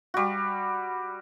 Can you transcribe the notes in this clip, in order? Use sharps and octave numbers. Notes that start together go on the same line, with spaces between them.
G3 F#4